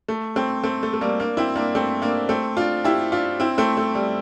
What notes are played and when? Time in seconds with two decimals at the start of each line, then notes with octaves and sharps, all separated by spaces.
0.08 A3
0.36 A3 C4
0.63 A3 C4
0.83 A3
0.94 A3
1.01 G3 A#3
1.19 A#3 D4
1.37 C4 E4
1.55 A#3 D4
1.75 A3 C4
2.02 A#3 D4
2.29 A3 C4
2.57 D4 F4
2.85 E4 G4
3.12 D4 F4
3.40 C4 E4
3.58 A3 C4
3.77 A3
3.95 G3